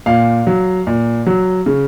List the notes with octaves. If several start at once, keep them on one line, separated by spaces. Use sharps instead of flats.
A#2 F5
F#3
A#2
F#3
C#3